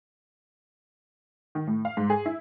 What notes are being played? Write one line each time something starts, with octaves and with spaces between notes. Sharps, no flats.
D#3
A2
F5
G#2
G#4
E4